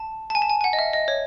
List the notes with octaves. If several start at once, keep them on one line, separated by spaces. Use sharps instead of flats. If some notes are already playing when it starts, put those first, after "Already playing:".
Already playing: A5
A5
G#5
A5
G#5
G#5
F#5
D#5
E5
D#5
C#5